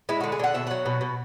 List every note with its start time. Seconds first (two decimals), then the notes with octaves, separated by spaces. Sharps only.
0.09 G#3 E4
0.21 D3 F#4
0.32 G#4
0.39 D3 F#5
0.54 B2 E5
0.67 F#3 F#5
0.86 B2
1.01 B2